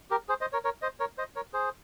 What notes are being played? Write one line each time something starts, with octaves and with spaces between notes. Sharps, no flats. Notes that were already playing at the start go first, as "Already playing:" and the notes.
G4 A#4
G#4 C5
C5 D#5
A#4 C#5
A#4 C#5
C5 D#5
A#4 C#5
C5 D#5
A#4 C#5
G#4 C5